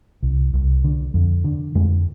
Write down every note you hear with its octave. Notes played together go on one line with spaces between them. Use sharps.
C2
C2
D3
F2
D3
F2 G#3